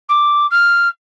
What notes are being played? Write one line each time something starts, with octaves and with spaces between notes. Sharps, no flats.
D6
F6